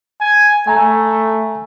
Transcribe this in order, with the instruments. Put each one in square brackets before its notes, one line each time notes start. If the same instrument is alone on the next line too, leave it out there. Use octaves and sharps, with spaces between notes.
[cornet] G#5
[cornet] A3 [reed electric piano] G#5 A#5